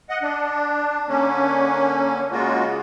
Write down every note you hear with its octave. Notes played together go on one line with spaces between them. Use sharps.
D#5 F#5
D4
D3 A#3 C#4
C#3 G#3 A#3 F4 F#4